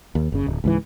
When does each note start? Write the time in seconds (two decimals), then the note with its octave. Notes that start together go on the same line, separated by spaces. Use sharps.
0.15 D#2
0.32 F#1 C#3
0.47 D1
0.64 C#2 G#2 E3